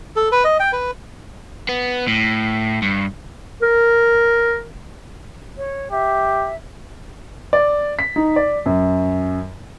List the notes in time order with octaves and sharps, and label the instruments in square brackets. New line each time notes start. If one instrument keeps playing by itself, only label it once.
[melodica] A4
B4
D#5
G5
B4
[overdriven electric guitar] B3
A2
G2
[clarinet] A#4
[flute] C#5
[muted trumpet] G4 [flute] E5
[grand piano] D5
B6
D#4
D5
F#2